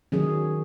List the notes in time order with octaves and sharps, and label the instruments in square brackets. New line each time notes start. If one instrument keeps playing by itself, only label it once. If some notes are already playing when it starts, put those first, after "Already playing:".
[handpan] D#3 F#3 C#4 G#4